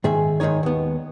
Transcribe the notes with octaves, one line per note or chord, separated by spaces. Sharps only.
G#2 D#3 G#4 E5
G#2 D#3 F3 D#4 C#5
D#2 B3